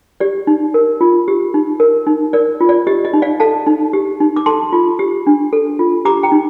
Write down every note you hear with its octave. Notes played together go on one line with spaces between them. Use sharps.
G4 D5
D#4
A#4
F4
G4
D#4
A#4
D#4
A#4 D5
F4
D5
G4 D#5
D#5
D#4
D5 F5
A4 F5 A5
D#4
G4
D#4
D6
A4 A5 C6
F4
G4
D4
A4
F4
G4 A#5 D6
G5 A#5
D#4